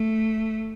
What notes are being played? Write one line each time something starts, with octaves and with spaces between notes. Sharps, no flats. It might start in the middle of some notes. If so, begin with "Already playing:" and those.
Already playing: A3